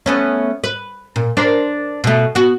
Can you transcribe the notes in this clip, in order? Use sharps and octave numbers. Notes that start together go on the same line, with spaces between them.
A3 B3 C#4
B4
A#2
D4 A#4 C5
B2 A3
B3 F#4